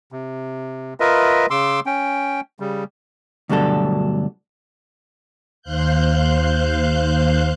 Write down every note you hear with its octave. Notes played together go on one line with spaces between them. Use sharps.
C3
F4 A#4 B4 D#5 E5
C#3 C6 D6 E6
C#4 G5
C#3 G3
D2 G2 B2 F#3 D4 A4
D#2 C5 F5 F#6 G6